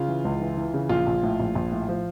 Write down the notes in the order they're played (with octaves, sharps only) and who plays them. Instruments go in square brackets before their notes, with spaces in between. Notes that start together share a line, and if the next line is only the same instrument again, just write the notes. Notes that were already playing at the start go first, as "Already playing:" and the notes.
Already playing: [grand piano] C#3 F4
E3
C#2
E3
E3
C#3
A#1 F4
A#1
A2
A#1
A#1
A2
F3